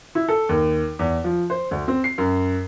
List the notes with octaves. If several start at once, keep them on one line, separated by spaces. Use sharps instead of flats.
E4
A4
D#2
E2
F3
C5
D2
C4
C7
F#2